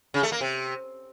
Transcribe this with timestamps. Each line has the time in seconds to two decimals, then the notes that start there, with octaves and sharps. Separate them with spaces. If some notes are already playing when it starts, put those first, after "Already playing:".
0.14 C#3
0.23 A3
0.32 A#3
0.41 C3